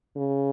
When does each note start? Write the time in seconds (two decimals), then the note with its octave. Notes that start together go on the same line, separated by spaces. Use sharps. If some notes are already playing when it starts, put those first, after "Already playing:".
0.17 C#3